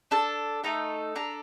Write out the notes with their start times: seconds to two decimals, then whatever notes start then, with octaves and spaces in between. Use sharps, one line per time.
0.11 D4 A4 A5
0.64 A3 D#4 A4 A#5
1.16 D4 A4 A#5